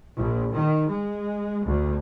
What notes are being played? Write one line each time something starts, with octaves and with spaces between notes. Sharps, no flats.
A#1
D#3
G#3
D2